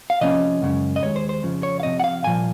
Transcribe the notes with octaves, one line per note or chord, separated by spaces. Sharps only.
F5
C3 F3 A#3 C#4 D#5
F#2 C#3 G#3
D#5
D#2 D#3 G#3 C#5
C5
C5
F2 C#3 F3
C#5
F5
C3 F3 C4 D#5
F#5
F5
C2 A#2 F3 A#3 G#5